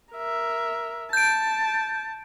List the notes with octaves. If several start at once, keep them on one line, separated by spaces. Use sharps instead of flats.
A#4 E5
A5 G6 D7